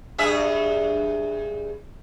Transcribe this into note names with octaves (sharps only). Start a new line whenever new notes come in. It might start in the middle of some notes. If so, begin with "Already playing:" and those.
G2 G#4 E5